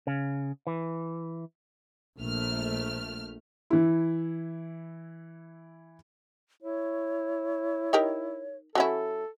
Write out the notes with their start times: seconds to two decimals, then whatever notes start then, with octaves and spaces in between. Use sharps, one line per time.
0.07 C#3
0.67 E3
2.19 A#1 A3 F6
3.70 E3 E4
6.62 E4 C#5
7.93 D#4 G4 A#4
8.75 F#3 C#4 E4 A4